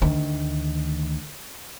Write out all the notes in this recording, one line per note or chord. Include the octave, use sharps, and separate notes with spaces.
D2 D#3